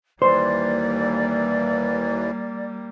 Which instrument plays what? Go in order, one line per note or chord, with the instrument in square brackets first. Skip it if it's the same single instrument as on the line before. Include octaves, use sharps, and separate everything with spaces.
[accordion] D#2 E3 [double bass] G3 A#3 [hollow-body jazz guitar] C5 [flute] D5